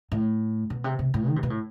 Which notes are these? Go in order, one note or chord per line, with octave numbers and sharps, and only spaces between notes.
A2
B2
C3
C3
A2
D#3
C3
B2
A2